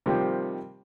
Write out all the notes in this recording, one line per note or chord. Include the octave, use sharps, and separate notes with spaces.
C3 D#3 F3 G3 A#3